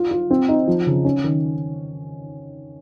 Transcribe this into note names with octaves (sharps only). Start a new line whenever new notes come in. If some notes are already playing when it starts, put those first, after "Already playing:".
Already playing: F4
F4
C4
D#4
F3
C#3
C#4
D#3